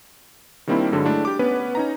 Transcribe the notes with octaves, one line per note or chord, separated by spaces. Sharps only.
D#3 G3 A#3 C4 D4 E4
G2 D3 F#3 G#3
G#3 A3 D4 E4
G4 D6
B3 C#4 B4
C#4 D#4 A#5